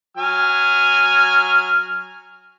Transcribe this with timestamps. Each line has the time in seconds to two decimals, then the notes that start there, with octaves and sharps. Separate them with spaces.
0.17 F#3 G#5 F6